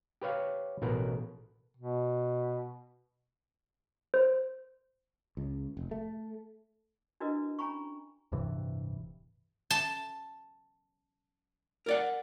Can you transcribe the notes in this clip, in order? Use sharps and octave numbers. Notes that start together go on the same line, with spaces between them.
G4 B4 C#5 F5
A1 B2 A#4 B4
B2
C5
C#2
F1
A3
D4 E4 F#4 A#4 B4 D#5
C#4 G#5 A#5 B5 C#6
D1 G2 C3 E3
A5
A#4 D5 F#5